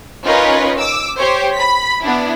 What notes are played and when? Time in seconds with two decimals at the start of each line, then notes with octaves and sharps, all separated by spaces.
0.24 C#4 D#4 F4 A#4 B4 C#5
0.78 D6 E6
1.19 G4 C5 C#5
1.55 B5 B6
2.01 B3 D4 E4